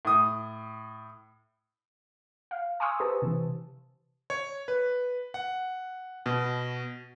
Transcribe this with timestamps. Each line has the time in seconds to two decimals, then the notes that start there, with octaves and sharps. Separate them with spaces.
0.05 A2 D#6
2.51 F5
2.80 G#5 C6 C#6 D#6 E6
3.00 G4 B4 C5 A5
3.22 C3 E3
4.30 C#5
4.68 B4
5.34 F#5
6.26 B2